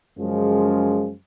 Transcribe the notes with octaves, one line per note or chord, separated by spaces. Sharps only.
F#2 C#3 F3 G#3